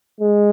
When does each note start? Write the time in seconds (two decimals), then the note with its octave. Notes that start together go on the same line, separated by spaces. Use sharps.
0.20 G#3